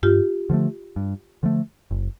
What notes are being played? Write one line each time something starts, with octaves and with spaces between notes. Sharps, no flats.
G2 F4 G4
D3 F3 A3
G2
D3 F3 A3
F#1